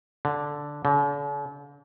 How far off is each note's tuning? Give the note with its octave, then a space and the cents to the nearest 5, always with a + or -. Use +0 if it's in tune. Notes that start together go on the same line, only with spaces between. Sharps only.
D3 -5
D3 -45